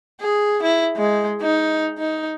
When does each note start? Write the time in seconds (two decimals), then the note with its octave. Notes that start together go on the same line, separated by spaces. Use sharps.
0.21 G#4
0.63 E4
0.96 G#3
1.41 D#4
1.98 D#4